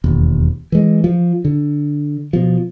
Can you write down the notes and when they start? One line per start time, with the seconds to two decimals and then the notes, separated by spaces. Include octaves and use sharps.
0.04 E1 D#2
0.72 E3 G#3
1.04 F3
1.45 D3
2.33 B2 F3